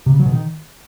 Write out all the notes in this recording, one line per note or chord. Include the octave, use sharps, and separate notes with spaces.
C3
C#3
F#3
B2
D#3